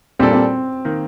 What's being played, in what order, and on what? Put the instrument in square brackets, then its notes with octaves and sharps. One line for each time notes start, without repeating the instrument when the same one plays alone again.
[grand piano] A#2 G3 A#3 D4 A4 [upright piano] C4
[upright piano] C4
[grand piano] D#3 A#3